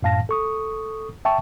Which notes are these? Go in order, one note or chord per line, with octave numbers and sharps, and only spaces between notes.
F#2 A2 F5 A5 A#6
A4 C#6 D#6
E5 G5 A5 C#6